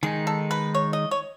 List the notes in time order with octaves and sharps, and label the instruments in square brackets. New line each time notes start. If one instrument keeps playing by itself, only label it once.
[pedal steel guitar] D#3 G#3 D#4 [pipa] G#4
[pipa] A4
B4
C#5
D#5
C#5